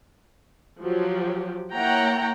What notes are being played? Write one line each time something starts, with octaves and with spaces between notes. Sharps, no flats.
F3 F#3 G4
A#3 E4 C#5 F#5 G5 A#5